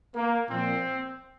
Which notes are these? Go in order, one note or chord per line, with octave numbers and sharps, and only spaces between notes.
A#3
A#2 F3 C4